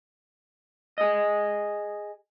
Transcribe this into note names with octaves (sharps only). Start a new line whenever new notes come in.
G#4 D#5